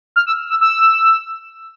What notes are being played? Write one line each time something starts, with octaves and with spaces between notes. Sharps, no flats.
F6
E6
E6
E6